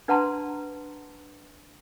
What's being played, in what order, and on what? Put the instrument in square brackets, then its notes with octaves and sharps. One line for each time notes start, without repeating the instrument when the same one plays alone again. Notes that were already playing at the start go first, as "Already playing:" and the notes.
[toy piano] D4 B4 F#5 A5 A#5 C6